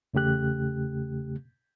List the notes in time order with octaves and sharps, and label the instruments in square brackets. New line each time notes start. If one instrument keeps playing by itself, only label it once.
[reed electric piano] E2 C#3 A3 G4 F#6